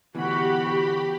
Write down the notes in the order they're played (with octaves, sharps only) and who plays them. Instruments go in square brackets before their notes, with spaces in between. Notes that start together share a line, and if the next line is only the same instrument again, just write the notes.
[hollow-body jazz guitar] D2 E3 [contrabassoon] B2 [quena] F#4 [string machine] G4 B5